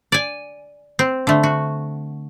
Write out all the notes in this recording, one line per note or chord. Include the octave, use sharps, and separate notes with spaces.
D5 G#5
C4
D3 A3
F#4